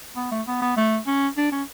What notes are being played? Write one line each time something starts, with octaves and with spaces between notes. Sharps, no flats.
B3
A3
B3
B3
A3
C#4
D4
C#4